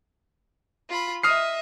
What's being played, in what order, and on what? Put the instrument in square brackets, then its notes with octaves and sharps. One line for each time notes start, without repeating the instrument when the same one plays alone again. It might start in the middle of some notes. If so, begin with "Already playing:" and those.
[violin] F4 B5
[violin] D#5 E5 [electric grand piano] D#6 F6 C7